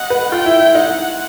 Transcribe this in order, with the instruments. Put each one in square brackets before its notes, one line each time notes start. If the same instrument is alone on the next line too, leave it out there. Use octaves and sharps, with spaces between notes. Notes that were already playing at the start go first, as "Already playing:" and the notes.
Already playing: [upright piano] D#5 [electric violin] F#5
[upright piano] B4
[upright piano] F4 [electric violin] G5
[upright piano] E4
E4
[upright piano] D#4 [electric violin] F#5